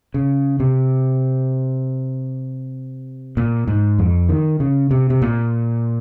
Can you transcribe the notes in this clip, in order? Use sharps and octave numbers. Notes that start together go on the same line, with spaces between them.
C#3
C3
A#2
G#2
F2
D#3
C#3
C3
C3
A#2